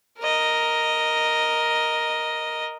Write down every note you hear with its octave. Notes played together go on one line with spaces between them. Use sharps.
A#4 D#5